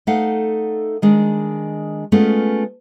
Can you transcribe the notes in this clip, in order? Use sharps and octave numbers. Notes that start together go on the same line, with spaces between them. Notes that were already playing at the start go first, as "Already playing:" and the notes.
A3 D#4 A4 F5 F#5
D#3 G#3 D4
G#3 A3 B3 C#4 F4